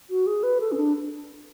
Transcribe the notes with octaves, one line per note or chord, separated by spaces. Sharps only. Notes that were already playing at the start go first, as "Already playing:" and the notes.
F#4
G#4
B4
A4
C#4
D4